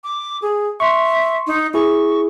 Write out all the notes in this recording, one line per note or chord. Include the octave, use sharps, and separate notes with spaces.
D6
G#4
E5 C6 C#6
D#4
E4 G#4 C#6